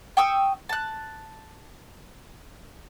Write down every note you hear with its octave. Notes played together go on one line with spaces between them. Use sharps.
G5 C#6 D#6 E6
A5 F#6